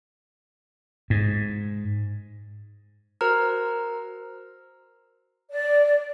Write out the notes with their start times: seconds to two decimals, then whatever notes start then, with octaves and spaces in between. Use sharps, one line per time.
1.10 G#2
3.21 F#4 A#4 C5 A#5 F6
5.52 D5